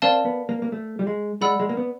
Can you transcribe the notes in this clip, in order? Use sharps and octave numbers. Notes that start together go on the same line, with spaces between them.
C4 A#4 D5 F5 A5
B3
A#3
A#3
A3
G3
G#3
G#3 D5 F#5 B5 E6
G#3
A#3
B3